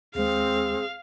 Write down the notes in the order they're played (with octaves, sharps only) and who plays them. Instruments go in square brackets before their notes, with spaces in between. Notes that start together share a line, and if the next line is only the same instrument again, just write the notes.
[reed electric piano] D#2 G#3 [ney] C4 [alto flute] G#4 [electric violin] F5